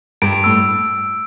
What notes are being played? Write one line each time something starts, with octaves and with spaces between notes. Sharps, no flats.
G2 D7
A2 E6